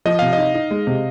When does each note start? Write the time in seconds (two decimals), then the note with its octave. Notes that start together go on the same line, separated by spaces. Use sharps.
0.05 F3 D#5
0.19 C3 F5
0.33 D#4 D#5
0.54 D#4
0.71 G#3
0.87 C3